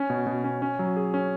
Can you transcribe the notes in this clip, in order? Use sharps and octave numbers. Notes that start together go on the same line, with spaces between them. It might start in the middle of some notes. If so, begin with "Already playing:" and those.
Already playing: C#4
B2
B2
C#4
C#4
F#3
G#4
C#4